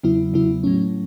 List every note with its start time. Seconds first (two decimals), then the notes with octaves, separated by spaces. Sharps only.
0.03 E2 C#3 F#3 B3 E4
0.34 E2 C#3 F#3 B3 E4
0.64 A2 F#3 A3 C#4